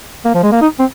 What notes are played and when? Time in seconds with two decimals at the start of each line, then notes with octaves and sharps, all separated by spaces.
0.25 A#3
0.34 F3
0.43 G#3
0.52 A#3
0.61 D#4
0.79 C4